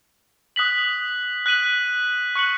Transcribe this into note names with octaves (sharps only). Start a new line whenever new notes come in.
D#6 F#6 B6 F#7
F#6 B6 D#7 F#7
C#6 F#6 C#7 F#7